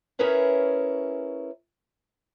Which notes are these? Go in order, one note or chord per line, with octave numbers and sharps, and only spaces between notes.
C#4 E4 G#4 A#4 B4 C#5